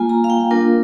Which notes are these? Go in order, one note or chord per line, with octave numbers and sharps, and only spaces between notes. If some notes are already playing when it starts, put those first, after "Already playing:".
Already playing: G3 A#3 F4 G#5
A#5
F5
G5
A#3 D4 F4 A#4